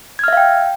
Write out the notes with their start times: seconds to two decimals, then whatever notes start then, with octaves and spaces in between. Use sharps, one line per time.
0.19 G#6
0.24 F6
0.28 E5
0.33 F5
0.37 G5